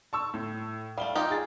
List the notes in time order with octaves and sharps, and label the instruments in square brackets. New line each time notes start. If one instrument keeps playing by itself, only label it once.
[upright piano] A5 C#6 E6
A2
[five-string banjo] G3 A3 [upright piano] F5 G7
[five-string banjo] D#4 F4 G4
[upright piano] G#4 A6